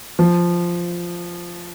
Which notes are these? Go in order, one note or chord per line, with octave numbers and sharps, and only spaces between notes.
F3